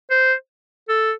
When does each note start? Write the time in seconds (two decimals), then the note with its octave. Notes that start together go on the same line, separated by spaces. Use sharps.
0.10 C5
0.89 A4